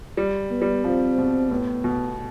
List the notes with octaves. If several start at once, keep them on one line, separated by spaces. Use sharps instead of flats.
G3
B3
G3
F3 C4
B2
A2 B3
B2